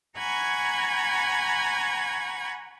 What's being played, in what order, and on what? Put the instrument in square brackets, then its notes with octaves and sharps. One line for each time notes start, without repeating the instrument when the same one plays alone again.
[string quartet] F#5 G#5 A#5 B5 C#6 G#6